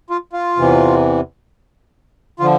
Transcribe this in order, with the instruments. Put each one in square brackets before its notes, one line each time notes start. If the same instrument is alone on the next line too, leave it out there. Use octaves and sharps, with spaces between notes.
[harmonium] F4
F4
E2 C3 E3
D3 F3 F4